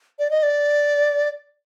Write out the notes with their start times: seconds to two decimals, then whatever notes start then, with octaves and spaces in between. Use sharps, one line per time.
0.19 D5
0.31 D#5
0.43 D5